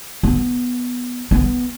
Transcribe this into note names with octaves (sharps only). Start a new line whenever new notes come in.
B3
B3